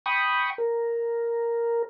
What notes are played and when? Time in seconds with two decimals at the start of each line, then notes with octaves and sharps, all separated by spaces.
0.06 G5 B5 C#6 D#6
0.58 A#4